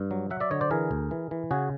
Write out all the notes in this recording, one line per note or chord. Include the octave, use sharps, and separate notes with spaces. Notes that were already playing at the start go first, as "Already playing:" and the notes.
Already playing: G2
F#3
F#3 E5 F#5
D5 E5
D3 C#5 D#5
C5 D5
E3 G#4 A#4
D2
E3
E3
C#3 F#4 G#4